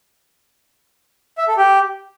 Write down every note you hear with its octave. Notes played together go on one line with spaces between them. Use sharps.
E5
A4
G4